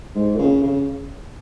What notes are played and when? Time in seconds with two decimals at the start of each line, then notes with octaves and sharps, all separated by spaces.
0.16 G#2
0.35 A#2
0.39 C#3
0.63 C#3